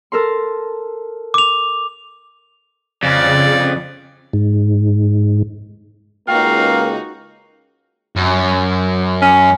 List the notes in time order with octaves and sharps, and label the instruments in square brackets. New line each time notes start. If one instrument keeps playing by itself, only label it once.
[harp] A4 A#4 C6
[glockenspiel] D6 F7
[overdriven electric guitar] F2 [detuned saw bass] C#3 [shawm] D5
[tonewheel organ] G#2
[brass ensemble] C#2 A#3 [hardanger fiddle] D#4 F#4 [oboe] F5 [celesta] G5
[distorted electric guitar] F#2
[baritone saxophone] C#4